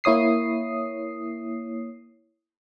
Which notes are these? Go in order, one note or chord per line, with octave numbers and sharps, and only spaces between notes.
A#3 E4 C#5 D#6 C7